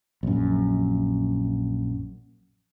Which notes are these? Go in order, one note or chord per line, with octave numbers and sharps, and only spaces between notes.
A#1 F#2